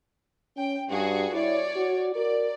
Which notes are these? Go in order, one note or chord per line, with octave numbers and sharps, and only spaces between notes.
C#4 G5
G2 F#4 G#4
E4 C#5 D5
F#4
A#4 D5